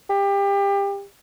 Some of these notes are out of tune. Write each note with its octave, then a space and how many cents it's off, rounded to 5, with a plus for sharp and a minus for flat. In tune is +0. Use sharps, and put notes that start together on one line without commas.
G4 +25